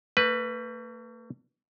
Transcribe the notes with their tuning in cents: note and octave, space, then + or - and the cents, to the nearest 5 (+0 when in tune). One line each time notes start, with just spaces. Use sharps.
A3 +45 B4 +0